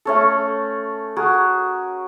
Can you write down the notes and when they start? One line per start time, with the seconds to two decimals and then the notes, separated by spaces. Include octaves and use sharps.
0.05 A3 C#4 A4
1.16 F#4 G#4 A#4